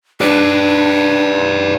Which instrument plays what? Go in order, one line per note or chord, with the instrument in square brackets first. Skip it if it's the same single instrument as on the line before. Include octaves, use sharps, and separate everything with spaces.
[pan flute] D4 [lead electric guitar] B4 D5